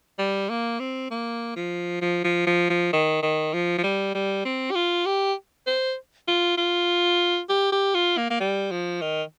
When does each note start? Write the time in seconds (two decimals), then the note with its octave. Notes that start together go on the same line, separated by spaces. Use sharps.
0.19 G3
0.49 A#3
0.80 C4
1.11 A#3
1.56 F3
2.01 F3
2.24 F3
2.47 F3
2.70 F3
2.93 D#3
3.23 D#3
3.54 F3
3.78 F3
3.84 G3
4.15 G3
4.45 C4
4.71 G4
4.75 F4
5.06 G4
5.67 C5
6.28 F4
6.58 F4
7.50 G4
7.72 G4
7.95 F4
8.17 A#3
8.30 A#3
8.40 G3
8.71 F3
9.02 D#3